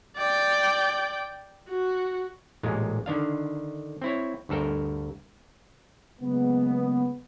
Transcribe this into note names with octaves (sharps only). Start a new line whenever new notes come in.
D5 G5
F#4
A1 A#2 G#3 F4
D3 D#3 D4 F5
C4 E4 C#5
D2 G2 A4 A#4 G5
C#3 F#3 G#3 A#3 B3